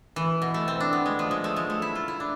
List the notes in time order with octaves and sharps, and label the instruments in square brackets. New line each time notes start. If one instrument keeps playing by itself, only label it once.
[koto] E3
B2
A3
C4
D4
B3
G#3
F3
G#3
A3
G#3
A3
E4
F4
E4
D4